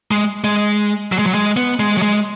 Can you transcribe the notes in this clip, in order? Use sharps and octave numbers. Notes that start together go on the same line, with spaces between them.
G#3
G#3
F#3
G#3
F#3
G#3
B3
G#3
F#3
G#3